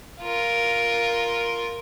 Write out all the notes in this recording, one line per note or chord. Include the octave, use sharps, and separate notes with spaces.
F4 A#4